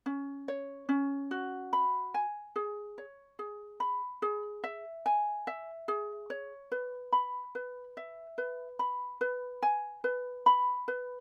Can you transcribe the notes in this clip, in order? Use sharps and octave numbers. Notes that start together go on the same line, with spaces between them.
C#4
C#5
C#4
F#4
B5
G#5
G#4
C#5
G#4
B5
G#4
E5
G#5
E5
G#4
C#5
B4
B5
B4
E5
B4
B5
B4
G#5
B4
B5
B4